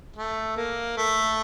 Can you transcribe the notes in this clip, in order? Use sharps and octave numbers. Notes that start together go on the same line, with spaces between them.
A3
A#3
A3